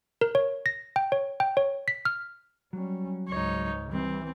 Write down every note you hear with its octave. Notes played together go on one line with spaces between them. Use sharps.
A#4
C#5
A#6
G5
C#5
G5
C#5
B6
F6
F#3 G3 C#4
C#2 G#2 D#4 C#5
E3 G3 C4